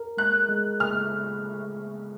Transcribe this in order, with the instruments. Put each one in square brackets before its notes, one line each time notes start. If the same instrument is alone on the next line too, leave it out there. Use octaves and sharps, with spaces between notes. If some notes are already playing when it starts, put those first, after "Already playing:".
Already playing: [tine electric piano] A#4
[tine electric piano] G#3 [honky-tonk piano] F#6
[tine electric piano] G#3
[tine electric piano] C#3 [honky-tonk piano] F6